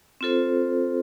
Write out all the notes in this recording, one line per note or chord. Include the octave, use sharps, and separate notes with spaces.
C4 F4 A4 C5